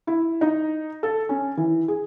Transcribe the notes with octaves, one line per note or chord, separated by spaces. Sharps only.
E4
D#4
A4
C#4
E3
G#4